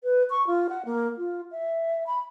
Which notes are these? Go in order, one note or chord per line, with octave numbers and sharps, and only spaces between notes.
B4
C#6
F4
F#5
A#3
F4
E5
B5